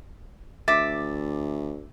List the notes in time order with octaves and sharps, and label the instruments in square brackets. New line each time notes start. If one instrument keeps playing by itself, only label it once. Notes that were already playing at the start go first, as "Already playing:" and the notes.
[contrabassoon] D2 [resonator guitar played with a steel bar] E5 [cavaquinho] D6 [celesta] A6